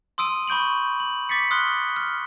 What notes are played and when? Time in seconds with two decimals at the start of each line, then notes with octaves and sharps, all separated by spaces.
0.18 C6 D#6 E6 D7 D#7
0.47 B5 C#6 G6 D7 F#7
1.00 F#7
1.29 D6 A6 B6 C#7
1.51 C6 D#6 F6 F#6 A6 G7
1.96 F6